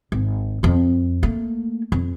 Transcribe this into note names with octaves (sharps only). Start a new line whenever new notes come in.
G#1
F2 C4
A3 A#3
F2